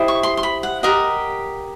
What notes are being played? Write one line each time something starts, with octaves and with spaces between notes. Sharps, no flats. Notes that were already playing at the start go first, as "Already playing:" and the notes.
Already playing: E4 G4 C5 D#5
C#6
C6
C6
B5
F#5
G4 A#4 D#5 F#5